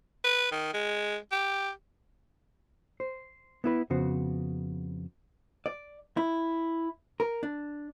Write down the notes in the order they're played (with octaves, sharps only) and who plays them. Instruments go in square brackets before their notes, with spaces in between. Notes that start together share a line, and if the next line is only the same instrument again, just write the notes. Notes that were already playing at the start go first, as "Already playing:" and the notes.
[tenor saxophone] B4
D#3
G#3
G4
[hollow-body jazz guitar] C5
B3 E4 B4
F2 C#3 B3 F#4 C5
D5
E4
A#4
D4